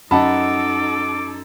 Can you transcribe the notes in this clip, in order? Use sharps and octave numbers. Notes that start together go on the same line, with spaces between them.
F#2 D#4 A4 D#5 F#5 A5 B5 D6